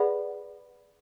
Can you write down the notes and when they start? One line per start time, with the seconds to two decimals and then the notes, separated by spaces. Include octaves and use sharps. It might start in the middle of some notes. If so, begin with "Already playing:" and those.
Already playing: G#4 B4 D5 F#5 B5